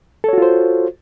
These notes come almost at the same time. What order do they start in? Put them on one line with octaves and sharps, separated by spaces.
A4 C#5 F#4 F4 C5